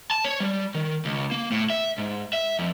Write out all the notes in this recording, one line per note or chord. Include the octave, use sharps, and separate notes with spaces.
A5
C#5
G3
D#3
C#2
A#3
A2
E5
G#2
E5
F2